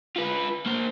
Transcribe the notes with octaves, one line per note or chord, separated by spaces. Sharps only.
F4 B4
A#3 C5